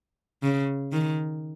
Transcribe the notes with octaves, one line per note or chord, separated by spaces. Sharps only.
C#3
D#3